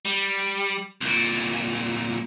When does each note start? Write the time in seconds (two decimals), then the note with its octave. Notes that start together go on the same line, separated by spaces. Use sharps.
0.05 G3
1.01 C2 A#2